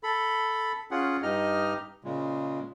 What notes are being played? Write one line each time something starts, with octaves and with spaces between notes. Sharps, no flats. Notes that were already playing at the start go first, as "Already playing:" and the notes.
A4 B5
C#4 F4 G#4 F#5
G2 D#4 G4 D#5 F6
A#2 C#3 G#3